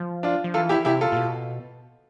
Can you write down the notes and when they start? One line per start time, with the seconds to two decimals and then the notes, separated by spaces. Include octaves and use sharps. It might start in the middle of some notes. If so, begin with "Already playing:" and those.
Already playing: F3
0.23 D4 F4
0.44 F3
0.54 E3 F4 A4
0.69 E4 G4
0.85 C3 E4 G4
1.01 F4 A4
1.12 A2
1.16 B2